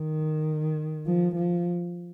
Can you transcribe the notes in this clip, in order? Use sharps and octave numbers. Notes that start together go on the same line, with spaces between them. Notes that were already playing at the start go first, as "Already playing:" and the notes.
Already playing: D#3
F3
F3